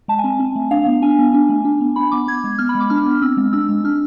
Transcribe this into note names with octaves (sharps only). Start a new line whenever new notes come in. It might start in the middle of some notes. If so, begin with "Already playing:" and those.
G#3 A5
G#5
C4
C4
A3
D4 F5
B3
D4 G#5
B3
D4
A3
D4
B3
D4 B5
B3 D6
B3 G#6
G#3
B3 F6
B5
G#3
D6
D4 F6
B3
C4 E6
G#3
D4 E6
G#3
D4 F6